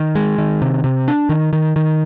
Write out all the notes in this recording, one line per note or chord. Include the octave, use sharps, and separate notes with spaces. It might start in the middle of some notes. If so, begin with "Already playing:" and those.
Already playing: D#3
G#3
D#3
C3
C3
D4
D#3
D#3
D#3